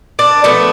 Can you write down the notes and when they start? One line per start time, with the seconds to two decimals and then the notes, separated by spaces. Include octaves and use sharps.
0.19 D4 D5
0.44 F3 A3 B3 D4 A4